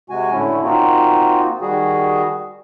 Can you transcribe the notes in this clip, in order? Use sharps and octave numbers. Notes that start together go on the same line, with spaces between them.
C3 G#3 F#4 G#5
A2 D3 A3 C#4 E4
A#3 C4 D#4 F4 F#4
D#3 G3 F#4 G#4